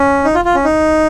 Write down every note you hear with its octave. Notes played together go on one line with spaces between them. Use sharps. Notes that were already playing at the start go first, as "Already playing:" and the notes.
Already playing: C#4
D#4
F4
F4
C#4
D#4